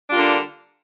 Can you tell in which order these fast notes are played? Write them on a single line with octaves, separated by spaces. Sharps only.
D4 G3 F4 A#3 D3